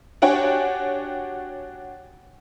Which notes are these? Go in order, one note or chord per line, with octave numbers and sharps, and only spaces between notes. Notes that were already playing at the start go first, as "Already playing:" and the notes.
D4 F#4 G4 C#5 G5 G#5